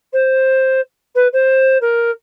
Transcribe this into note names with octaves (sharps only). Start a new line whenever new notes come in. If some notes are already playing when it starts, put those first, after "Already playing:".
C5
B4
C5
A#4